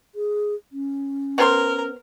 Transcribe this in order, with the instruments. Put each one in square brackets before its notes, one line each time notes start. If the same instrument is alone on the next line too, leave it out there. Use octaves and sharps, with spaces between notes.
[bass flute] G#4
C#4
[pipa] B3 C5 C6 [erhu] A#4